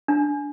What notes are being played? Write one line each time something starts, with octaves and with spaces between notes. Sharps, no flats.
D4